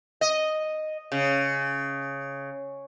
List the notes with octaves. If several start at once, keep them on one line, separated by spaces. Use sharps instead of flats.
D#5
C#3